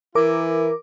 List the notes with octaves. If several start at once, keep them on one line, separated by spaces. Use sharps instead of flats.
E3 E4 A#4 D6